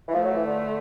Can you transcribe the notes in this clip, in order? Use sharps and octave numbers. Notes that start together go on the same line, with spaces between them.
E3
F3 A3
F#3
E3
D3